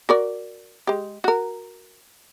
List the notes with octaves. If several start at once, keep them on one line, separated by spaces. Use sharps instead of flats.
F#4 A#4 D5
G#3 G4
F#4 A#4